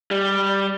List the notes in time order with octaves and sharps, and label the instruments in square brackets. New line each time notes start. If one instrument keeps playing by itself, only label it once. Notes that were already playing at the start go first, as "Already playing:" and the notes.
[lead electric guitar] G3